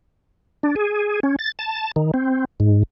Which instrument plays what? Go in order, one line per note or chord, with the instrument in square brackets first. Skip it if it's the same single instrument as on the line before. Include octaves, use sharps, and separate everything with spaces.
[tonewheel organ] D4
G#4
C#4
A6
A5
D#3
C4
G#2